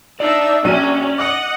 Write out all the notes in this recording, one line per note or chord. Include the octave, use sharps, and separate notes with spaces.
D4 D#4 D5 E5
A#1 F#3 C#4 D#7
D#5 F#5 D6 D#6